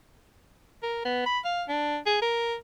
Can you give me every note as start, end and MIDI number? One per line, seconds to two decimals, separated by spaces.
0.83 1.03 70
1.05 1.25 59
1.26 1.39 83
1.45 1.63 77
1.68 1.98 62
2.06 2.18 68
2.22 2.56 70